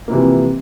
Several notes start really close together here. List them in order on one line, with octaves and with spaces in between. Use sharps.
A#3 C3 E3 F3